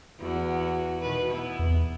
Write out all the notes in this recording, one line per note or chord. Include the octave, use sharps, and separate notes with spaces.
E2 F#4
B2 D#3 B4
B3 E4
E2